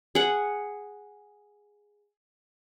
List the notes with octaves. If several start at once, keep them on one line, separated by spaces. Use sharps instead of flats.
G#4 F#5